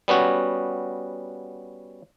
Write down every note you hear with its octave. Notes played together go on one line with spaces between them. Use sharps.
G3 B3 C#4 F#4